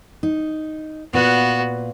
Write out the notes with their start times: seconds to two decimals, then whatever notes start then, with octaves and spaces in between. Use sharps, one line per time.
0.23 D#4
1.13 A#2 B3 F#4 B4 F5